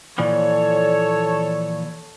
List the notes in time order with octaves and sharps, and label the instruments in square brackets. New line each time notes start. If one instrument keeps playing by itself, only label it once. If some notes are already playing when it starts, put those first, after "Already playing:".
[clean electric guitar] A#2 E3 F3 [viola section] A4 C#5 [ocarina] D5